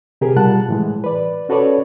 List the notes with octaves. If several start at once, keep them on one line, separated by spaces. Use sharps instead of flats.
C3 G4 G#4 A#4
B2 G3 F4 F#5 A5 F#6
A2 E3 G#3
B4 D5
C#4 F#4 A4 B4 C#5 D5